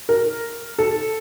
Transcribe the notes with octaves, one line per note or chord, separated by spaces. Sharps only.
A#4
A4